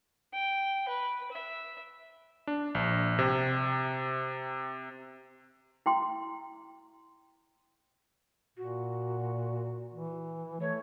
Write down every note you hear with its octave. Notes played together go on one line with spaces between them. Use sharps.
G5
B4
E5
D4
A#1
C3
E4 G5 C6
A#2 F#4
E3
A3 C#5